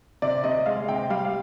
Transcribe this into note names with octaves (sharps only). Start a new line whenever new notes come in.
C3 D5
C3 D#5
G#3 F5
C3 G5
G3 F5
F5